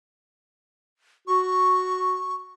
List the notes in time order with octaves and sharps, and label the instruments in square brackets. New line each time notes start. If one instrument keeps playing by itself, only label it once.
[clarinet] F#4 [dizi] C#6